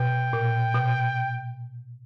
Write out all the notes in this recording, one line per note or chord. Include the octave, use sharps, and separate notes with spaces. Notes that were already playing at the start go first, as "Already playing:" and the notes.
Already playing: B2 G5
A#2
B2